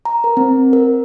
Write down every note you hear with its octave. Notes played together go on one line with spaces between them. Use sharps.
A#5
A#4
C4
A#4